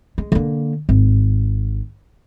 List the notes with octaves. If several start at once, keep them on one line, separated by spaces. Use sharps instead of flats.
G#3
D3 A#3
G#1